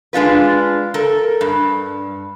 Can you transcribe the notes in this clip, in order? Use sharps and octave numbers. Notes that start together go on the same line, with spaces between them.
G#3 D4 F4 B4
A4 A#4
G2